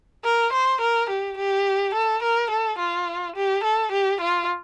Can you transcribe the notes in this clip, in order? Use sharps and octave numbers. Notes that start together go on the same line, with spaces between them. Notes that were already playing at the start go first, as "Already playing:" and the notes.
A#4
C5
A#4
G4
G4
A4
A#4
A4
F4
G4
A4
G4
F4